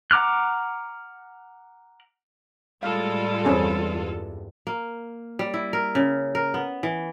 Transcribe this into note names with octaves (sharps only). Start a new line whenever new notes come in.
F#5 A#5 D6 F6 F#6
A2 G3 G#3 F4 A4 F5
E2 G2 C4 C#4 G#4
A#3
G3
E4
A#4
C#3
A#4
B3
E3